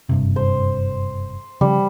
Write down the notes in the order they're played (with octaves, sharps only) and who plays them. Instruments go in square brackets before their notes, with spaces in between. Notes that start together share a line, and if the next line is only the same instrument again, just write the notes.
[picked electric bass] F#1 G2 C3
[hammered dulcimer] C5
[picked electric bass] C#3 F3 [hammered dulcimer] G3